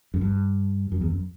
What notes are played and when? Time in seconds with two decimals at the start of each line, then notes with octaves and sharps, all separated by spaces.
0.14 F#2
0.21 G2
0.92 F#2
1.01 E2
1.11 F#2